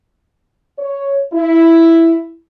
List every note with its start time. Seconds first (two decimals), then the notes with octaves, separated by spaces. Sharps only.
0.79 C#5
1.33 E4